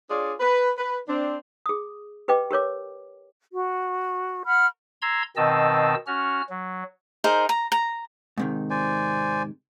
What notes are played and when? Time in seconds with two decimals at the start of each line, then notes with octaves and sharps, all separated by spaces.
0.09 D4 F4 G#4 C#5 D5
0.40 B4
0.78 B4
1.08 C4 D4
1.66 G#4 D#6
2.28 G4 B4 D#5 G5 D6
2.51 G4 A#4 C#5 D6
3.52 F#4
4.45 F#5 B5 F6
5.02 A#5 C6 E6 G#6
5.36 B2 D#3 C4 D#5 A5 E6
6.07 C#4 F#4 F6
6.50 F#3
7.24 D#4 G#4 A#4 C5
7.49 A#5
7.72 A#5
8.38 G#2 C3 D#3
8.70 C5 D5 G#5